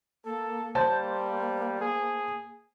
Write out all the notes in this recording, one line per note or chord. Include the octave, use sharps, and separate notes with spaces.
A#3 A4
G3 A#3 C5 A5 G6
G#4